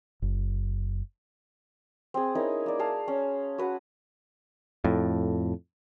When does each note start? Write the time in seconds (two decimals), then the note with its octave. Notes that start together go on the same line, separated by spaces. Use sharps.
0.22 F#1
2.14 C4 G#4
2.35 C#4 D#4 E4 A#4
2.66 A#3 D5
2.79 G#4 F5 A5
3.08 C#4
3.58 F#4 B4 F#5
4.84 F2 A2